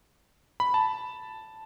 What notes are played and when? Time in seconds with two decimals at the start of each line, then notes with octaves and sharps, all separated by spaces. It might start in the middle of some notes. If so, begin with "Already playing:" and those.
0.60 B5
0.74 A5